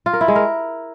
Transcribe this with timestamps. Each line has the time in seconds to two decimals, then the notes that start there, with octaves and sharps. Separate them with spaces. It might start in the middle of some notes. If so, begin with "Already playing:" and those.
0.06 F4
0.13 A#4
0.21 E4
0.28 G#3
0.35 A#4